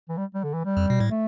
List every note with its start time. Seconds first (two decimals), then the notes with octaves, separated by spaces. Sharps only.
0.09 E3
0.17 G3
0.34 G3
0.44 D3
0.54 E3
0.65 G3
0.77 F2
0.90 B2
1.00 A2
1.11 A3